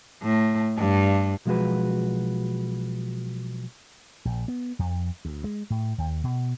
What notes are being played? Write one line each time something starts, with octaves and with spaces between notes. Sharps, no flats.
A2
G2
B1 F3 G#3 F#4 B4
A#1
B3
F2
D2
G#3
A2
D#2
B2